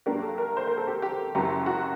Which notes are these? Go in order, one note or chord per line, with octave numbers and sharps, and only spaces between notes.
G2 F#3 A#3 D4 G4
A4
A#4
C5
A#4
A4
G4
G4
F#1 F#2 F#3 G4
F#4